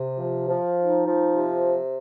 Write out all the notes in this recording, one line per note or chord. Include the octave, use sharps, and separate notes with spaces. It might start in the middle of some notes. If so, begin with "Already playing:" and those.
Already playing: C3
F3
F3
D#4
F3
C3